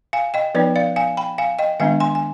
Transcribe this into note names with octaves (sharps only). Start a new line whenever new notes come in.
F5 G#5
D#5 G5
F3 B3 D#4 B4 D5
D5 F5
F5 G#5
G5 B5
F5 G#5
D#5 G5
D#3 G#3 B3 D4 F5 G#5
G#5 C6
G#5